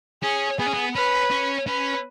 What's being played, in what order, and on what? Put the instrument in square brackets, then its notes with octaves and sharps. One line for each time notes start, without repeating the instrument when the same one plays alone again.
[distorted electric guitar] C#4 [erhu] G#4
[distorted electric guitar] B3 [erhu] G#4
[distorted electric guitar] C#4
B3
[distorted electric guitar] C#4 [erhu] B4
[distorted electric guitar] C#4
[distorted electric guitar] C#4 [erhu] B4